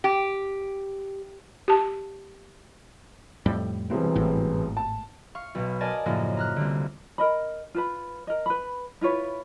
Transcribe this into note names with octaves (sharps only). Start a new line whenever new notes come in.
G4
G4 A5
F2 A2 G3
E1 C2 E3 C4
G#1 A2
A5
F5 C#6
B1 B2
A#4 D5 D#5 G#5 A5
F#2 A2 C#3 F3 A#3 D#4
A#5 F6 F#6
C2 D3
A#4 D#5 B5
F4 B4 B5
A#4 D#5
B4 B5
E4 F4 B4 C#5